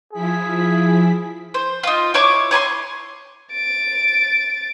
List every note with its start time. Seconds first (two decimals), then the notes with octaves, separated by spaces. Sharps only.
0.13 F3 E4 G#4 B6
1.54 C5
1.83 D#4 F4
2.14 E4 C#5 C#6 D6
2.51 C#5 G#5 A#5 C6
3.53 A6 D7